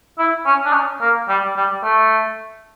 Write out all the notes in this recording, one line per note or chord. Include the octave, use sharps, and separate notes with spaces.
E4
C#4
D4
C#4
A#3
G3
G3
A3